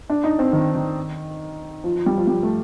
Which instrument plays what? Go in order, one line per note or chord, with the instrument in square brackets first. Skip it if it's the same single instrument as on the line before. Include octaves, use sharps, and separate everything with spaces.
[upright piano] D4
D#4
C4
D#3
D#3
F3
F3
G3
F3
G3
A3